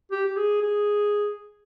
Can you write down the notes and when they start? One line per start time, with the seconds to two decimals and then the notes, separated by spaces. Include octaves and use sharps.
0.11 G4
0.26 G4
0.37 G#4
0.62 G#4